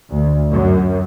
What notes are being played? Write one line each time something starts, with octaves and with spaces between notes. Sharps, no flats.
D2
F#2